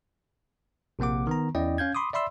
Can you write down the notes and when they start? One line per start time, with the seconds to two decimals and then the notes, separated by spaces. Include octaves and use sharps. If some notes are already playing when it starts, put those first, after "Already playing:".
0.99 A#1 C3 A#3 F#5 D6
1.27 D#3 B3 A#5
1.55 E2 C#4 E4 D5 D#5 G5
1.78 C#4 F5 G6 G#6
1.95 B5 C6 D6 D#6
2.13 D5 E5 B5 C6 E6